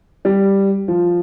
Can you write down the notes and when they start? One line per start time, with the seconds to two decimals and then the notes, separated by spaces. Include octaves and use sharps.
0.25 G3
0.88 F3